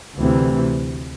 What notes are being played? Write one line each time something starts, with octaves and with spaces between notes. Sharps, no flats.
D2 C3 E3